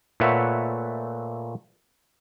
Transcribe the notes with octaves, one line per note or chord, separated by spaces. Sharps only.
A#2 A3 B4 C#5 E5 F#5